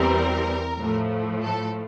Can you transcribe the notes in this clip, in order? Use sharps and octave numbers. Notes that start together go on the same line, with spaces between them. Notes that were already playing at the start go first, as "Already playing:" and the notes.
Already playing: E2 E3 G3 C4 A#4
A2 F3 A3
A4